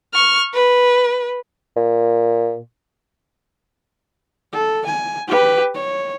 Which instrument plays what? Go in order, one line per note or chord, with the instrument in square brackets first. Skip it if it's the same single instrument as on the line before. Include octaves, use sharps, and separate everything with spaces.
[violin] C#6 F6
B4
[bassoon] A#2
[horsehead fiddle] A4
G#5
G4 B4
C#5